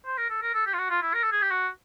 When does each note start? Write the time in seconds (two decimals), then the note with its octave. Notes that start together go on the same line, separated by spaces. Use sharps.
0.06 C5
0.18 A#4
0.30 A4
0.42 A#4
0.54 A4
0.67 G4
0.74 F4
0.78 F#4
0.90 F4
1.02 E4
1.14 A#4
1.23 A4
1.32 G#4
1.42 G4
1.51 F#4